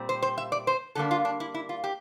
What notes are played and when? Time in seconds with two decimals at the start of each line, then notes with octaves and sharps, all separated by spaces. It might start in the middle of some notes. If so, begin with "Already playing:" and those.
Already playing: A#2 G3 C4
0.09 C5
0.22 C5
0.38 E5
0.52 D5
0.67 C5
0.95 D3 G3 A#3 D4 A4
1.11 F4
1.25 D4
1.40 E4
1.54 E4
1.69 F4
1.84 G4